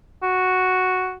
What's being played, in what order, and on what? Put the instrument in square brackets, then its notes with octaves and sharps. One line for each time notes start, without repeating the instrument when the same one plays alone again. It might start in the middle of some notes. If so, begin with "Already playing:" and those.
[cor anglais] F#4